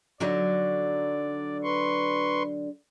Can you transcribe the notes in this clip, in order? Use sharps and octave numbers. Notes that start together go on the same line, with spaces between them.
D3 F#3 D#4 D5
B4 C6 C#6